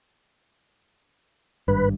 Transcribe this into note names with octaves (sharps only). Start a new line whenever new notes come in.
G#1 G2 B4